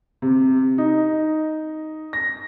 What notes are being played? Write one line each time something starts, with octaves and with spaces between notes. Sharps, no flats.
C3
D#4
A#6